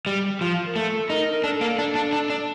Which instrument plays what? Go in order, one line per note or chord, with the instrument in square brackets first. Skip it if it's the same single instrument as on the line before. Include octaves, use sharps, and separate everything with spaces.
[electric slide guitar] G3
F3
[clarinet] A#4
[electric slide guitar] A3 [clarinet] A4
[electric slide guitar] D#4 [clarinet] A#4
[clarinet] A#4
[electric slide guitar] D4 [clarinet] A4
[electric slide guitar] A#3
D4
D4
D4
D4